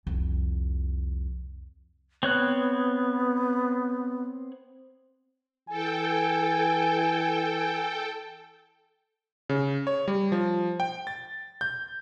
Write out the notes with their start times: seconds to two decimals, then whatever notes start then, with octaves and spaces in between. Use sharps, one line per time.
0.07 C2 F2
2.23 B3 C4 C#5 F#6
5.69 E3 A4 G5 G#5
9.49 C#3
9.87 C#5
10.08 G3
10.32 F3
10.80 G5
11.07 A6
11.61 G6